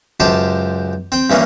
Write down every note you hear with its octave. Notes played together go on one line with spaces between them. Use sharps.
C#2 F#2 G4 C5 A5
C4 G5
G2 E3 A#3 C#4